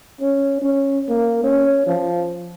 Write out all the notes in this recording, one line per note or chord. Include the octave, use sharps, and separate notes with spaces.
C#4
C#4
A#3
C#4
F3